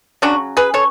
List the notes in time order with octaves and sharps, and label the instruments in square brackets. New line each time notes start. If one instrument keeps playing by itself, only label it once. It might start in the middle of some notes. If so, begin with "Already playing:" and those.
[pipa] C#3 F#3 C#4 D4 F#4
G#4 B4
A4 C#5